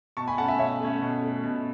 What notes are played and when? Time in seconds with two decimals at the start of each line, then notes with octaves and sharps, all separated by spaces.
0.17 B2 A5 C#6
0.28 G#5 B5
0.38 A3 F#5 A5
0.41 C#4
0.48 E5 G#5
0.59 B2 C#5 E5
0.80 A3 C#4
1.02 B2
1.22 A3 C#4
1.44 B2